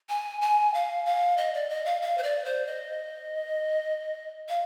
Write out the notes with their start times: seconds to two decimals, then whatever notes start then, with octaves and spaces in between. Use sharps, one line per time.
0.09 G#5
0.41 G#5
0.74 F5
1.06 F5
1.37 D#5
1.54 D5
1.69 D#5
1.85 F5
2.02 F5
2.18 C5
2.23 D5
2.45 C5
2.66 D#5
4.49 F5